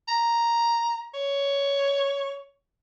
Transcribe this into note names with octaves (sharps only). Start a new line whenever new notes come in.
A#5
C#5